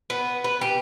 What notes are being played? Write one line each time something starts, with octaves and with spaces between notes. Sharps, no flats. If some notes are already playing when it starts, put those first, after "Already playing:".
B3
B4
G4